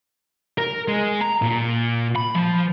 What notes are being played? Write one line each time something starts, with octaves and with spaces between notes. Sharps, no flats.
A#4
G#3
A#5
A#2
B5
F3